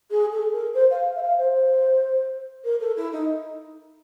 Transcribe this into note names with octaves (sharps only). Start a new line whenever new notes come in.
G#4
A4
A#4
C5
F5
E5
F5
C5
A#4
A4
E4
D#4